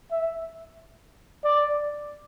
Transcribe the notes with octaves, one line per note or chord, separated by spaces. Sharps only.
E5
D5